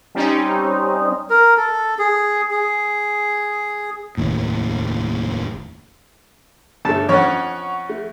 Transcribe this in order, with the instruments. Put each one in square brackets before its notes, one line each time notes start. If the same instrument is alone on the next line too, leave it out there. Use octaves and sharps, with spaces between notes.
[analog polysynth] G3 C4 C#4 D#4
[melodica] A#4
A4
G#4
G#4
[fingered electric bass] F1 D#2 A2
[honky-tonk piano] G1 A3 [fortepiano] A4 A5
[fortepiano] F2 C#4 [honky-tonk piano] C#5 F#5
[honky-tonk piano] A3